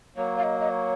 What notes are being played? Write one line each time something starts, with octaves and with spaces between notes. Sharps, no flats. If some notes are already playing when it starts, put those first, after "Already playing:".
F#3 A#3 C#5
F5
D#5
D#5
C#5